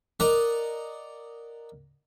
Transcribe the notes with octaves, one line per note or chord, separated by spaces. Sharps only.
A#4 D5 D#5 F#5 A#5